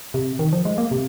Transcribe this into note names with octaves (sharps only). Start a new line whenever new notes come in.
C3
D#3
F3
G#3
A#3
C3